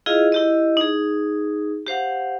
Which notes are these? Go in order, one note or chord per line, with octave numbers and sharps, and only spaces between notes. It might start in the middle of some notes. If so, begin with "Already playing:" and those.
E4 F4 G#4 D#5 F5
E4 G4 D#5
D#4 G#4
G4 C5 F5 F#5